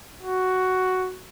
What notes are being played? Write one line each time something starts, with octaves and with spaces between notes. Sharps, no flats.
F#4